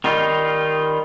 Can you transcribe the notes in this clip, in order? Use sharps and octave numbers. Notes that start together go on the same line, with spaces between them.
D#3 G3 D#4 F4